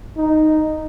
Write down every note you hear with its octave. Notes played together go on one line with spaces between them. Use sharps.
D#4